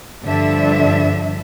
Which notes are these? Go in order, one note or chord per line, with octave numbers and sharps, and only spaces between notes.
G2 D3 F3 D4 E5